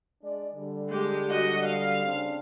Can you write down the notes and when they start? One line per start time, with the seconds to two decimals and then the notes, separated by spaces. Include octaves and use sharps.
0.22 G#3 D4 D5
0.54 D3 G3
0.89 G#3 G4
1.30 F#4 D#5
1.66 F5
2.04 C#3 C4 D4